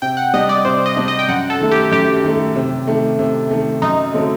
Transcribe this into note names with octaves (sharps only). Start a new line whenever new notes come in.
C3 G5
F#5
G3 D4 D#5
D5
C3 C5
D#5
G3 D4
D#5
G5
F#2 F#5
A4
D#3 A3
G4
F#2 G4
D#3 A3
C3
D#3 A3
C3
D#3 A3
F#2 D#4
D3 F#3 A3 C4